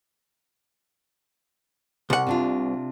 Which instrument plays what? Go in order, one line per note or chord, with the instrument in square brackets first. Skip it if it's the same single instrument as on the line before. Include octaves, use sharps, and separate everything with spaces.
[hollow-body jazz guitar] C2 F#5
[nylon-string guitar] C3 D4 F4